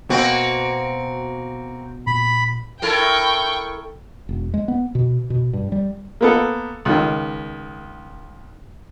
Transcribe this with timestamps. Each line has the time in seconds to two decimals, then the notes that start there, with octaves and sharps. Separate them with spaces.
0.10 B2 A#3 C4 F#4
2.07 A#2 B5
2.82 E4 A4 A#4 G5 C#6
4.29 E1
4.54 G#3
4.68 B3
4.95 B2
5.30 B2
5.53 G2
5.72 G3
6.21 A#3 B3 A4
6.85 C#2 D#3